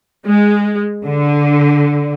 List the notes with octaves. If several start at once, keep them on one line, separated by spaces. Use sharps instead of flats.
G#3
D3